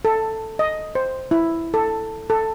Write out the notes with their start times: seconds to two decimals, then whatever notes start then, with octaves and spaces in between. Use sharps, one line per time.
0.05 A4
0.59 D#5
0.95 C5
1.31 E4
1.74 A4
2.30 A4